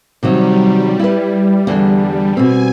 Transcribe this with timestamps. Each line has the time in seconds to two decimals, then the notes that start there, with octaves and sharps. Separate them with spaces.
0.23 C3 D#3 F#3 G3
0.99 E4 B4
1.67 E2 D3
2.37 B2 C4 G#5